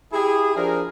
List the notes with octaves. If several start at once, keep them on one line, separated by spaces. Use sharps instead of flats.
E4 G4 G#4
F3 D4 G#4 A#4